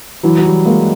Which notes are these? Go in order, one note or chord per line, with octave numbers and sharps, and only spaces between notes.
E3 F#3
F#3
E3 G3
G#3 A#3